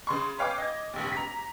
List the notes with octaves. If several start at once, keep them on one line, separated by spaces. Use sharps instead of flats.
C#3 C6 C#6
B4 C#5 F5 G5 G#5 D6
D#5 G#6
F1 A#1 D#2
A#5 B6